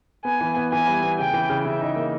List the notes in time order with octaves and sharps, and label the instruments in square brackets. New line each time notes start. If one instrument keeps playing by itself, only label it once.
[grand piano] B3 [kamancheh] G#5
[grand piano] E3
B3
[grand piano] E3 [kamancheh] G#5
[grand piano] G3
B3
[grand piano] C#3 [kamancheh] G5
[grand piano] E3
C#3
[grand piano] C#3 [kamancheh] E5
[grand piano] D#4
A#3